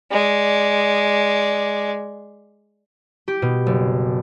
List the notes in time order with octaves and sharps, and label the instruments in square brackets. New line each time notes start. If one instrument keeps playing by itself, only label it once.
[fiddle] G#3 D5
[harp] G4
B2
F#1